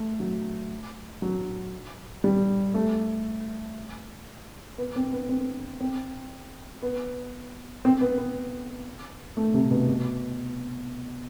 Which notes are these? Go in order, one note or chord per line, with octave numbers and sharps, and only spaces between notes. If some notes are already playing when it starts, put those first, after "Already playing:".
Already playing: A3
F#3
F#3
G3
A3
B3
C4
B3
C4
C4
B3
C4
B3
B3
A3
C3
B2
B2